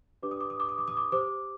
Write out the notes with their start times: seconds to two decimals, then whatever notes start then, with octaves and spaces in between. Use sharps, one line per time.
0.23 D4 G4 B4 D5 D6
0.31 D#6
0.41 D6
0.50 D#6
0.60 D6
0.69 D#6
0.78 D6
0.88 D#6
0.97 D6
1.12 G4 C5 D6